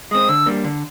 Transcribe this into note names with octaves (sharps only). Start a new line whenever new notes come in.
G#3 C4 D#6
D3 E6
G3 A#3 D4
D3